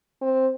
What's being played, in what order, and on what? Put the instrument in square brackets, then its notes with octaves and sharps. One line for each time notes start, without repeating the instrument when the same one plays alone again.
[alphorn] C4